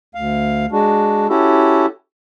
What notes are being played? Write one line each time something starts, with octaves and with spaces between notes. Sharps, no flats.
D2 F5
G#3 D4 F#4
C#4 E4 F#4 G4 A4